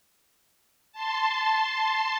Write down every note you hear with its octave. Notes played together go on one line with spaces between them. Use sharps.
A5 C6